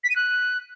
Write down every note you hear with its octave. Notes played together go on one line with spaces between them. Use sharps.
B6
D#7
F#6